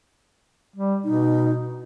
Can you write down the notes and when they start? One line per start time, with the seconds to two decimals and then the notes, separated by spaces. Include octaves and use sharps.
0.76 G3
1.05 B2 D#4